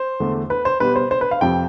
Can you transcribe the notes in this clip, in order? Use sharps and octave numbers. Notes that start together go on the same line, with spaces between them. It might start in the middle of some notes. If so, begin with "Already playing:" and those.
Already playing: C5
E2 D3 A3
B4
C5
B2 G3 B3 B4
C5
C5
B4
F5
F2 C3 F3 G5